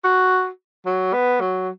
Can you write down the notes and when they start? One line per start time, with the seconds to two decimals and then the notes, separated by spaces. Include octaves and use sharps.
0.04 F#4
0.86 F#3
1.13 B3
1.40 F#3